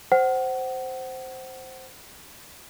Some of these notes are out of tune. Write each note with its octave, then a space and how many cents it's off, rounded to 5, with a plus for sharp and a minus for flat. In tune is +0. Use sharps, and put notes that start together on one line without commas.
C5 +0 F#5 +25